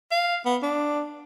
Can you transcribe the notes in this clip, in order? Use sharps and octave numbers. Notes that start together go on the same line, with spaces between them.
F5
B3
D4